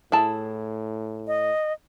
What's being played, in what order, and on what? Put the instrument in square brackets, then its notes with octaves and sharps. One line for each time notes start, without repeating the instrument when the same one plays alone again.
[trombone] A2 [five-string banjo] E4 G#4 A5
[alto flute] D#5